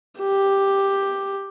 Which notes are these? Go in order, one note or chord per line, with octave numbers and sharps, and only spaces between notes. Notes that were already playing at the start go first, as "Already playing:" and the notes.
G4